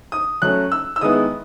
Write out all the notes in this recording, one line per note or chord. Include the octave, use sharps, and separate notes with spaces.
D#6
F#3 A3 C#4 F#6
E6
E6
D#3 G#3 B3 E4 D#6